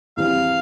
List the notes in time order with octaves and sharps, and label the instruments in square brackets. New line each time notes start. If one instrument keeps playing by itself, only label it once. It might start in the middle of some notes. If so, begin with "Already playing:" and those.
[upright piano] E2 E3 G3 C4 [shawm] F5